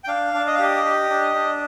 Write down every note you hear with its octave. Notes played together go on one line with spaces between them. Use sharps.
G5
D4 F5
D4
D#5
F5
G4 D#5
G4
D4
D4